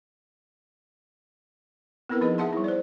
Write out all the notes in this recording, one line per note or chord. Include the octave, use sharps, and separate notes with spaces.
B3 C4 E4 A#4 B4
F3 D#4 G#4 D#5
G#4 E5 F#5 A5 C6
G3 E4
C5 D5